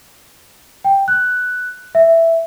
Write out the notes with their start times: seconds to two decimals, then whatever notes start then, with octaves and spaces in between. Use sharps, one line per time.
0.84 G5
1.08 F#6
1.95 E5